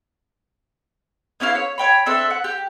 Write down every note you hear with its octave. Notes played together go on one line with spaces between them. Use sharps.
B3 C#4 E4 F5
C#5
C#5 G5 B5
C4 D4 A4 E5
F#5
G4